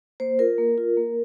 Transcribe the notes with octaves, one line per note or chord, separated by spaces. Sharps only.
A#3 C5
F4 A#4
A#3
F4
A#3